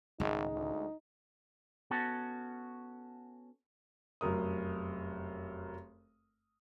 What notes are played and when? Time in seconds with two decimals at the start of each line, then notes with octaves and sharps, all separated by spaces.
0.20 G#1 C#2 A2 D#3 G#3 D#4
0.54 D2
1.91 B3 C#4 F#4 A4
4.21 F1 F#2 A#4 D#6